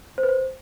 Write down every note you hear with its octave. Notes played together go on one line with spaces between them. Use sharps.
C5
B4
C5